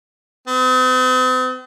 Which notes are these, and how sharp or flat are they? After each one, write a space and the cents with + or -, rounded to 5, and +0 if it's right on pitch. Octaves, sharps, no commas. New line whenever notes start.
C4 -45